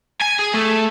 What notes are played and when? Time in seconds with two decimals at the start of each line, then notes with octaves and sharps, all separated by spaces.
0.22 G#5
0.39 G#4
0.54 A3